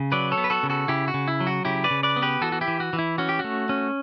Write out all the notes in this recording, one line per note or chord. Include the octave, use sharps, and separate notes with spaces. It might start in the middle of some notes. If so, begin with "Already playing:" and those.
Already playing: C#3
F#3 B4 D5
A4 C#5
B3
B4
F#4 A4
C#3
F#4 A4
C#3 E4 G4
F#4
C#3
E4
F#3
F#4
C#3 E4 G4
B4 D5
C#3
B4 D5
B3
G4 B4
E3 F#4 A4
F#4
E4 G4
E3
F#4
E3
E4
C#4 F#4
G4
F#4
A3
C#4